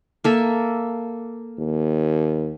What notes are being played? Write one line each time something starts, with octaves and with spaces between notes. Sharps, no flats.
A#3 A4 E5
D#2